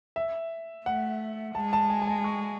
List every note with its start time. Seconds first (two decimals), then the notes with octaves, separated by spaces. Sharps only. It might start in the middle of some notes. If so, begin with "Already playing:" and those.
0.16 E5
0.86 A3 F#5
1.55 G#3 A5
1.73 A5
1.90 G#5
2.02 G#5
2.07 A5
2.24 C#6